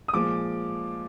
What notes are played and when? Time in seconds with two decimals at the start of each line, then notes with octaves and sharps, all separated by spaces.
0.08 D#6
0.13 A#2 F3 G#3 D6